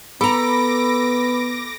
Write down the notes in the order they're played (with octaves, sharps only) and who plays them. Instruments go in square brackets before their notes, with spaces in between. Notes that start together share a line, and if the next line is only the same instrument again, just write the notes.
[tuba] B3 [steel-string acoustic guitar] A4 A#5 [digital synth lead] B5 [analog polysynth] D6 A#6